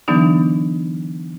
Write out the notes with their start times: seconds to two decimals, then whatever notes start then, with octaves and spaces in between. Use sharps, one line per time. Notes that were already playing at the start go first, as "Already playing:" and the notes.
0.08 D3 E3 F#3 B3 D4 D#4